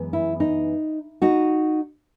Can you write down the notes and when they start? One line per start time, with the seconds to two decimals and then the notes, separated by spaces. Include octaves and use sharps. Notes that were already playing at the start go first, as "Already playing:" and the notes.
Already playing: F#2 E3 G#3 B3
0.13 E4
0.40 D#4
1.22 D#4 F#4